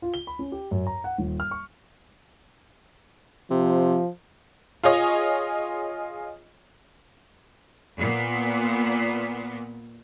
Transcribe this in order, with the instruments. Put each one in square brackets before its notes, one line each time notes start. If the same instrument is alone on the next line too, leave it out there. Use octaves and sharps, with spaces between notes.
[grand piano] F4
G7
B5
C#4
G4
F#2
A#5
F#5
D#1
F6
C#6
[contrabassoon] C3 [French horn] F3
[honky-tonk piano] F4 G#4 C#5 D#5
[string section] A#2 B3